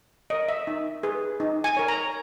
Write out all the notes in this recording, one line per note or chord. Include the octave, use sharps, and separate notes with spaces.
A#4 C#5 D#5
E5
D#4
G#4 B4
D#4
G#5
A#4 C#5
A#5